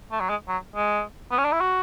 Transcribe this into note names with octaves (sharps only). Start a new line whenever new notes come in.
A3
F#3
G#3
F#3
G#3
B3
C#4
D4
E4
F#4